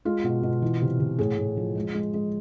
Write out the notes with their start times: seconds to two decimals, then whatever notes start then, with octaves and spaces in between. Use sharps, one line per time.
0.05 G#3 F4
0.24 B2
0.43 B2
0.62 E3
0.82 C3
1.00 C3
1.19 A2 G#4
1.38 A2
1.57 F3
1.75 G#3
1.94 G#3
2.14 G#3